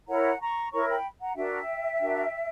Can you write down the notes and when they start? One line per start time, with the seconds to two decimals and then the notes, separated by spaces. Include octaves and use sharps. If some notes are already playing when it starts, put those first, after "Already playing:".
0.08 E4 A#4 C#5 F#5 A#5
0.40 A#5 C#6
0.72 E4 A#4 C#5 A#5 C#6
0.89 G5 B5
1.20 F#5 A#5
1.36 D4 F#4 A#4 E5 G5
2.00 D4 F#4 A#4